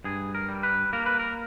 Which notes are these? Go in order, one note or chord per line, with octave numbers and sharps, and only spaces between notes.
G2 G#4
A#4
G3
B4
A#3 A#4
B4
A#4